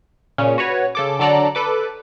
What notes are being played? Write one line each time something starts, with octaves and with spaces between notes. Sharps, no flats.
A#2 C#3 C#4
F#4 B4 C#5
C#3 A4 D6
D3 F#3 A4 D5 A#5 F#6
A4 B4 D6